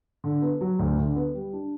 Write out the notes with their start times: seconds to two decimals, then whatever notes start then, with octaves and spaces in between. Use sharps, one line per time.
0.24 D3
0.42 B3
0.61 F#3
0.79 D2
0.98 D3
1.16 B3
1.34 G3
1.53 D4